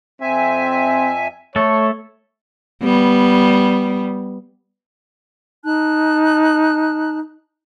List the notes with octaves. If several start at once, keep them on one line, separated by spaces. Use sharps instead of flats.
F2 C4 E5 G#5
A3 A4 C#5
G3 B3
D#4 A5 F#6